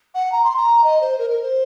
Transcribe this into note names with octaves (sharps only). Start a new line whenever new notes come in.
F#5
A#5
C6
A#5
D#5
C5
A#4
A#4
C5